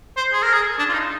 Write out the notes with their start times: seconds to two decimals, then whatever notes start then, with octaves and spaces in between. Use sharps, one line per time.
0.17 C5
0.33 G#4
0.43 A#4
0.53 G#4
0.79 D4
0.89 F4
0.93 D#4